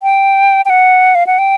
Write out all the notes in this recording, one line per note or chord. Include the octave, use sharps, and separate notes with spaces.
G5
G5
F#5
F5
F#5
G5